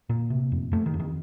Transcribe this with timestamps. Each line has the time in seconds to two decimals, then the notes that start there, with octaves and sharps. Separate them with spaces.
0.09 A#2 A#3
0.30 C3
0.52 F2
0.72 F2 A3
0.86 D#3
0.94 F2
1.00 D#3